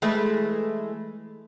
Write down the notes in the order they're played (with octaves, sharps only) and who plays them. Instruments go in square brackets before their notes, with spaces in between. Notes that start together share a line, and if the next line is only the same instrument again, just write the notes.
[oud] E3 G#3 A3